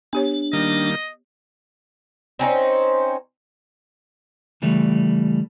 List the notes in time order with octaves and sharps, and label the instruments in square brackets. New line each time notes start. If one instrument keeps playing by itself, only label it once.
[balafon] B3 G4 C#5 [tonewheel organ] D4
[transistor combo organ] D#3 G3 A#3 [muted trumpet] D#5
[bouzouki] C4 C#4 D#4 C5
[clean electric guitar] C#3 E3 G3 A3